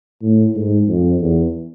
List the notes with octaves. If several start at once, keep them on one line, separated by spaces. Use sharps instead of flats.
A2
G#2
F2
E2